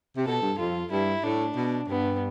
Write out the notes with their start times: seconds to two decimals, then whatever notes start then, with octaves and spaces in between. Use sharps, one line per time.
0.17 C3
0.26 B2 A4
0.41 G2
0.58 F2 F4
0.90 G2 E4
1.23 A2 D4
1.56 B2
1.88 G2 B3